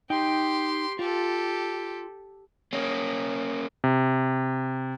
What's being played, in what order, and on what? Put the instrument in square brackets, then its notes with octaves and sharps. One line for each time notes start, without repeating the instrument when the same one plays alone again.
[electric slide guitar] D#4 G5 [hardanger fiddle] G4 C6
[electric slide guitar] F4 [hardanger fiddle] G4 A4
[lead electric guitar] A#3 C#4
[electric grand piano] C3